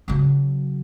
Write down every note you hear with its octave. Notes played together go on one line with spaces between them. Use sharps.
C#3 F#3